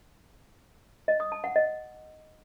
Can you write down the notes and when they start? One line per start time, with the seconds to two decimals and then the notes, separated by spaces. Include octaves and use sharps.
1.08 D#5
1.20 D#6
1.32 A5
1.44 F#5
1.56 D#5